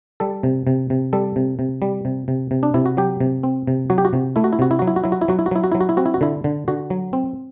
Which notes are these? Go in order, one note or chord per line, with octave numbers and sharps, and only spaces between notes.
G3 A4
C3
C3
C3
G3 A4
C3
C3
G3
C3
C3
C3
D4
C3 E4
F#4
F#3 G4
C3
C4
C3
F#3 F#4
G4
F#4
C3
A3 E4
F#4
E4
C3 F#4
E4
F#3 F#4
E4
F#4
F#3 E4
F#4
E4
F#3 F#4
E4
F#4
F#3 E4
F#4
F#3 E4
F#4
E4
C4 F#4
E4
F#4
D3 E4
D3
D3 F#4
F#3
C4